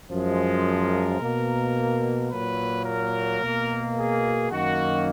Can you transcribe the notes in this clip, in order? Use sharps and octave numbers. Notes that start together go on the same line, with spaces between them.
F#2 F3 G#3
A#4
B2 A#3
A#2 F#3 A#3 B4
A#4
B2 A#3
G#4
F#2 D#3 A#3 F#4